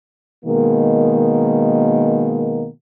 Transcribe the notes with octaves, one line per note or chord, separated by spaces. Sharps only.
B2 D#3 G#3 A#3